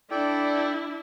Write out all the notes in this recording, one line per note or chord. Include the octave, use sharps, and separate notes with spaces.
D4 E4 A4 D5 G5